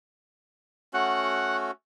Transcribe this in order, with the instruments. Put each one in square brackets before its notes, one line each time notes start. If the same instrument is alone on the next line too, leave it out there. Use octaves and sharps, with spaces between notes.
[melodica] A3 C#4 F#4 [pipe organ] F#5